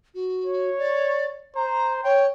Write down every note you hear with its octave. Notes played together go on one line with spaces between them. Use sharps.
F#4
C#5
D5
C5 A#5
C#5 G5